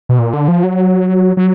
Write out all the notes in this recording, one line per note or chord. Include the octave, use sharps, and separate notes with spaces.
B2
A#2
D3
F3
F#3
F#3